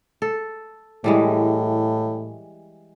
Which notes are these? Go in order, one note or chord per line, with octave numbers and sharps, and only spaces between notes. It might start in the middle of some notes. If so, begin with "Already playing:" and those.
A4
A2 E3 G3 G#3